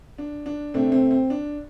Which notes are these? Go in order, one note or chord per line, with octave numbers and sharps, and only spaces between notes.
D4
D4
C3 A3 C4 D4
C4
C4
D4